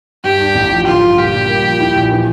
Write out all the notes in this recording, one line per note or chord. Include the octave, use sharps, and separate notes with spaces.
G2 G4
D4
A1
F3
D3 F4
G2
A#2 G4
G3
A#3
F3
E4
A#1
E3